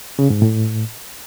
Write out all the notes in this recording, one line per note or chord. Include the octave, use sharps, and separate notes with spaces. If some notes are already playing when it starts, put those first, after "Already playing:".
C#3
G#2
A2